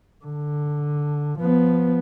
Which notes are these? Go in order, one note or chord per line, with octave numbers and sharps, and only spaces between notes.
D3
F3 B3